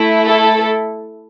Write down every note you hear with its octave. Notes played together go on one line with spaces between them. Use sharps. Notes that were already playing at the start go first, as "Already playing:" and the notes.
Already playing: A3 E4
A4